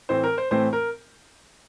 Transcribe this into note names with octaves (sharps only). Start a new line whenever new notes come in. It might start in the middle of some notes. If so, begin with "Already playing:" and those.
A2 E3 A3 C4 C5
A#4
C5
A2 E3 A3 C4 C5
A#4